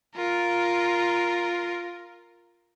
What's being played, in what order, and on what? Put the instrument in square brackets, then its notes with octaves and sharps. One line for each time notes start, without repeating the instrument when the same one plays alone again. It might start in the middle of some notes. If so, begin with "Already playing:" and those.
[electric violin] F4 A#4